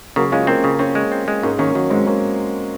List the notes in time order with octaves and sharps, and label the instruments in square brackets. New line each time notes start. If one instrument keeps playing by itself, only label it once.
[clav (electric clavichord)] C#3 [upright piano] F#3 A#3
[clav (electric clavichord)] G#3 [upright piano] C#4 F4
[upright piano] A#3 C#4 [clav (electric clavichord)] C4
[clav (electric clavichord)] C#3
[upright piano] A#3 C#4 [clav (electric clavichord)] C4
[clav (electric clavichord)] G#3
C4
G#3
[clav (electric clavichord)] G#2 [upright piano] A#3 C#4
[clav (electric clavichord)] D#3 [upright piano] A#3 C#4
[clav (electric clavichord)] D#3 [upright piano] F#3 A#3
[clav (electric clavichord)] G#2 [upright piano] G#3 C4
[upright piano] A#3 C#4